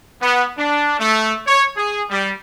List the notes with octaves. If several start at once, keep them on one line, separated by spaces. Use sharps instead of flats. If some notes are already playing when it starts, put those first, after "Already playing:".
B3
D4
A3
C#5
G#4
G3